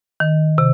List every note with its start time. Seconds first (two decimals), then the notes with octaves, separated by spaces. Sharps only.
0.20 D#3
0.58 C3